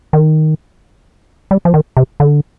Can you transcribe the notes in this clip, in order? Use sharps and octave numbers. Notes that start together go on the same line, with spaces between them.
D#3
G3
F3
D#3
C3
D3